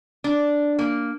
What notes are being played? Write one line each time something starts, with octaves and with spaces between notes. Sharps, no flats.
D4
A#3